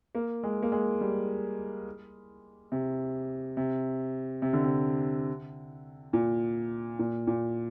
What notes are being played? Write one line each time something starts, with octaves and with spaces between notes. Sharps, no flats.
A#3
G#3
A#3
G#3
G3
C3
C3
C3
D3
C3
A#2
A#2
A#2